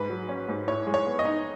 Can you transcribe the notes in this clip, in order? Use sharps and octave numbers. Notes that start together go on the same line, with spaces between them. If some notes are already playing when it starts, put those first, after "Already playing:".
Already playing: G#2 B4
F#3
C#4
G#2
A2 C#5
G#3
C#5
B3
D#5
D#4